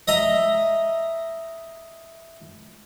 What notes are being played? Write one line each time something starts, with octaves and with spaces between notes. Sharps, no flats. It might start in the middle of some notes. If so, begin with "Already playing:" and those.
D#5 E5 A#5